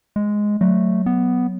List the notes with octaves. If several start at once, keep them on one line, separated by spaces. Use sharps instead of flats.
G#3
F#3 A3
B3